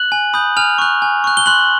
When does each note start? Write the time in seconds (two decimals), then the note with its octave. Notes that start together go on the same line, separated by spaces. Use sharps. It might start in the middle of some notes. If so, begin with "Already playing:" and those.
Already playing: F#6 F#7
0.12 G#5
0.34 B5 D#6 G6
0.57 G#5 F6 F7
0.78 C#6 F#6
1.02 G#5
1.24 C#6 F#6
1.37 G7
1.46 C6 F#6 F#7